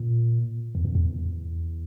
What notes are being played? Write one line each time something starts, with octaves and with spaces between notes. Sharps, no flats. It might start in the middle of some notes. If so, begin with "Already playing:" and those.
Already playing: A#2
E2
F2
E2